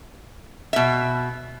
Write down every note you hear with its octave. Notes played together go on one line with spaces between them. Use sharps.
B2 E5